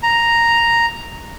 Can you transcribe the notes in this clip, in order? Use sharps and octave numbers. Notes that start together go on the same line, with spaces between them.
A#5